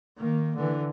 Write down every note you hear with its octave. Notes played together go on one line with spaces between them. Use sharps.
D#3 A#3
D3 E3